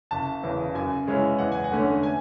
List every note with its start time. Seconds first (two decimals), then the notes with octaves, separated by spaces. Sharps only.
0.11 F#1 A5
0.43 E2 C#3
0.75 F#2 G#5
1.07 C#3 G#3 C#4 E4
1.39 E2 F#5
1.52 G#5
1.64 F#5
1.72 D3 A3 C#4
2.03 G#5